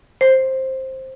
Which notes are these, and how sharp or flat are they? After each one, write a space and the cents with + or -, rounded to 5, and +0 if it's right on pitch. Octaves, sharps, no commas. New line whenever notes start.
C5 +10